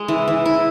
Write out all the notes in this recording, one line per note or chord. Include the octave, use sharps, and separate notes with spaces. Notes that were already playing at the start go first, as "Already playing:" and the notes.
Already playing: G#3
E3
E3
E4